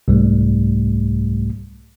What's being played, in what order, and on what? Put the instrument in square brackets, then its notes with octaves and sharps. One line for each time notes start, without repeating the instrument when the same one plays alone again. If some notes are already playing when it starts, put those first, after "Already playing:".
[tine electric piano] C2 G#2 G3 A3